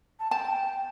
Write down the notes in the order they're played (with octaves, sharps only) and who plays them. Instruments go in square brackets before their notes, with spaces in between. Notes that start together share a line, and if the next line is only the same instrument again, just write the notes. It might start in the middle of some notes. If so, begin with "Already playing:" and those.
[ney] A5
[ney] G5 [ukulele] A5